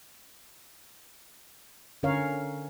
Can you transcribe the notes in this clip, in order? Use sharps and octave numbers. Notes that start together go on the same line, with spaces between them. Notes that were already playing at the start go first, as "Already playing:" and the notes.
D3 C#4 A#4 C#5 F5